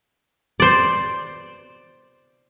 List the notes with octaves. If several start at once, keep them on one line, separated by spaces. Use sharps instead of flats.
C5 D5